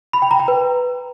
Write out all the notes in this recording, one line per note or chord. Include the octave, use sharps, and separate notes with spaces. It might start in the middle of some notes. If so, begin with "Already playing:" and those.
B5
G5
A#5
G5
B4